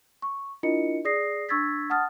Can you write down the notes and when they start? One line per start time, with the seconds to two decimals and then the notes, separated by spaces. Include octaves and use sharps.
0.22 C#6
0.63 D4 E4 F4 A#4 D#5 C#7
1.05 G#4 D5 D#6 A#6 C7
1.49 D4 C#6 E6 G#6 A6 B6
1.90 F#5 A5 D#6 F6 A6